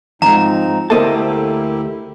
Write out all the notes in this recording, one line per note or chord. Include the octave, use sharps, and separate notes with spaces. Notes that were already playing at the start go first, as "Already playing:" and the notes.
E2 G#2 F3 C4 D#4 A#5
D2 A3 A#3 E4 G4 C5 D#5 A5